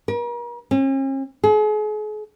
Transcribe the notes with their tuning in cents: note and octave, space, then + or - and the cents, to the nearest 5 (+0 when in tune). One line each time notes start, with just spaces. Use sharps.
A#4 +40
C#4 -45
G#4 +40